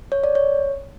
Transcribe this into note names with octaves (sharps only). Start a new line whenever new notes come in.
C#5
D5
C#5